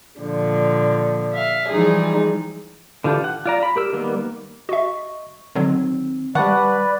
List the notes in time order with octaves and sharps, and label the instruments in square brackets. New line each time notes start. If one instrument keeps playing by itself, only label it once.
[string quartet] A#2 D3 F3
E5 F5
E3 F3 G3 G#3 D#4 G#4
[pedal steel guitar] D3 E3 F4 G4 A4
F#5
F4 D5 A#5
B5
G4 A#4 E6
D#3 G3 A#3 B3
[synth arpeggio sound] F#4 E5 [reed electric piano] D#5 C#6
[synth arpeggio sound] B2 D3 F#3 [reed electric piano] D#3 C4
[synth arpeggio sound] D#3 [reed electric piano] G3 A5 C#6 [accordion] B4 D5 [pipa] F#5